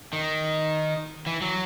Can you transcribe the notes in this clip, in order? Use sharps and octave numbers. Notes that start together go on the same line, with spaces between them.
D#3
E3
F#3